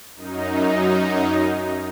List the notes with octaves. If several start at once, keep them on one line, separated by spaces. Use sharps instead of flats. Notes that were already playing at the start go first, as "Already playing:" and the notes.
F#2 D#4